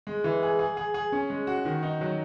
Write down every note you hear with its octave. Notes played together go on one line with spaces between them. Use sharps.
G#3
E3
G#4
G#4
G#4
G#4
C#4
G#3
F#4
D#3
D#4
F#3